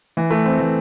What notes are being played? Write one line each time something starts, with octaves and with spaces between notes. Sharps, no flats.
E3
A3
C4
E3